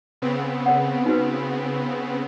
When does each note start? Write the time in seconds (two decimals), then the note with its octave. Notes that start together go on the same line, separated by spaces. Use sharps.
0.22 C#3 B3 C4
0.66 A#4 C#5 F#5
1.06 D#4 F#4 B4